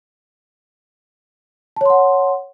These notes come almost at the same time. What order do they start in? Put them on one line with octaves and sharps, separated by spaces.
A5 C#5 C6 F#5